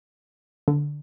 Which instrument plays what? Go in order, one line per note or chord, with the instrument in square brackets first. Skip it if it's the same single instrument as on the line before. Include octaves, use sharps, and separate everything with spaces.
[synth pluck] D3